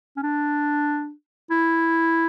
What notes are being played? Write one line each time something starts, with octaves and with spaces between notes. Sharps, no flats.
C#4
D4
E4